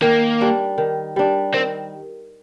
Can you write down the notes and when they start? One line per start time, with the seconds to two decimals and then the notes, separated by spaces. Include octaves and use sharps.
0.02 D#3 A#3
0.41 G3 D4
0.78 D#3
1.16 G3 D4
1.54 D#3 C4